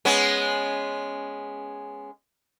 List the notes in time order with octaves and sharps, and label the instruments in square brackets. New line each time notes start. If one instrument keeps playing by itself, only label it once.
[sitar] G#3 B3 C#4